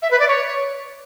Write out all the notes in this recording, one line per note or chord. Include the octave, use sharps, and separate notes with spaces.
E5
B4
D5
C#5